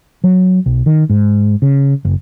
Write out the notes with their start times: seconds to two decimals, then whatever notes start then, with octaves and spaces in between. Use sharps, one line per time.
0.24 F#3
0.66 B1
0.86 D#3
1.10 G#2
1.62 C#3
2.05 F#1